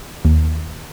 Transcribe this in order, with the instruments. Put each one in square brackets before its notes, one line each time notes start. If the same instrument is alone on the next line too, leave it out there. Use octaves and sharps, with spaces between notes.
[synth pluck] D#2